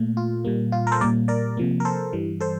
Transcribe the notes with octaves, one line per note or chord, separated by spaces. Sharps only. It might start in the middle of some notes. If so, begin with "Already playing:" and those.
Already playing: A#2 A3
F4
A#2 G3 A#3
F4
A#4
A4 C5
A#2 G3 A#3 A#4 D5
A#4 D5
C3 F3 A#3
A#4
A4 C5
G2 E3 G3
A4 C5